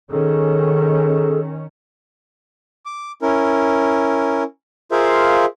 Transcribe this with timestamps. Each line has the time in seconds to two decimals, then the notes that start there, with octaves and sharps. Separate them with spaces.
0.11 D#3 C#4 G#4 A4
2.86 D6
3.22 C#4 E4 A#4
4.91 F4 G#4 A#4 C5 E5 F5